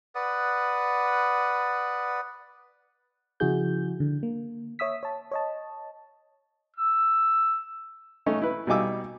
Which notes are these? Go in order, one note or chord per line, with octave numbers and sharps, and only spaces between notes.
B4 D5 F#5 D#6
C#3 F3 E4 F#4 G#4 G6
D3
A#3
C#5 E5 D#6 E6 B6
C#5 A5
C#5 D#5 A5
E6
A3 C#4 D#4
E4 B4
B2 G3 D#4 G#5 D6 E6